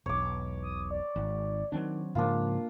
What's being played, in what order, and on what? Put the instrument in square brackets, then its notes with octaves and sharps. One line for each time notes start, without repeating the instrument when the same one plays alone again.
[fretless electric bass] E1 B1 [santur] C#5 D6
[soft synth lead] D#6
D5
[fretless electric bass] G#1
[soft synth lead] D#3 [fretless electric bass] F#3 C4 D4
[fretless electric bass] G#2 C#3 F3 [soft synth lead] A#3 [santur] D4 F4